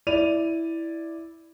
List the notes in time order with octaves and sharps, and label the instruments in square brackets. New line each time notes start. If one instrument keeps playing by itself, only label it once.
[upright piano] E4 D5 D#7 F7